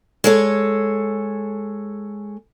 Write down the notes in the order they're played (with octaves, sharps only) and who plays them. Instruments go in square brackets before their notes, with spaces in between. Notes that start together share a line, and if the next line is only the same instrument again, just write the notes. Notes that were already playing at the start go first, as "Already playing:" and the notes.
[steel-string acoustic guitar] G#3 A4 C#5